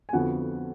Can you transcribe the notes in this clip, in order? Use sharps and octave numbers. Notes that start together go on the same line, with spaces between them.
G#5
F2 D3 F3 B3 F#4 F#5